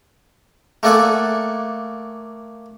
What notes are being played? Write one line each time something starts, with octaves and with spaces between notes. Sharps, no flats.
A3 A#3 A4 D5 F#5 G#5